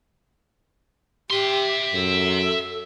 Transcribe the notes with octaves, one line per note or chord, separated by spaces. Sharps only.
G4 E5 C6
F#2 A4